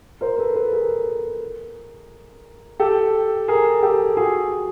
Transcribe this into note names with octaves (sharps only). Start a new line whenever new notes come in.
A#4 C5
A4 B4
A4 B4
G#4 A#4
G4 A4
G#4 A#4
G4 A4
F#4 G#4